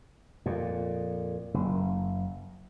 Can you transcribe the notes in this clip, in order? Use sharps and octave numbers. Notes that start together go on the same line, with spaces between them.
F2 A#2
F#1